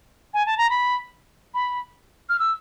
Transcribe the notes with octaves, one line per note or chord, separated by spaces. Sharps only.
G#5
A5
A#5
B5
B5
F6
E6